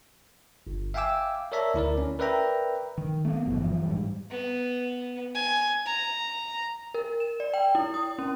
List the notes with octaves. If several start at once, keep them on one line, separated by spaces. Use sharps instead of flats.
G1
E5 F5 G5 G#5 D6 E6
A#4 C#5 D5 E5 A5 A#5
D2 E4 A#4 D5
C#4
A#4 B4 D5 E5 G5 A#5
D#3
A3 B3
G1 F#2 B2 E3
F#2 E3 F3
G#2 G3
B3
G#5
A#5
A#4
E7
D5
G5
E4
D#6
C#4